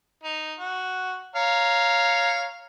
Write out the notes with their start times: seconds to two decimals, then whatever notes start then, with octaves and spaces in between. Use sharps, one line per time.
0.24 D#4
0.59 F#4
1.36 C#5 F5 A#5